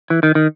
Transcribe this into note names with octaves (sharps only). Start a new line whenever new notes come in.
E3
D#3
D#3